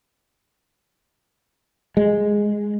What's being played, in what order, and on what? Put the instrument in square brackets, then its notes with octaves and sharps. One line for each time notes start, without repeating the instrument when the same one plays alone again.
[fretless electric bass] G#3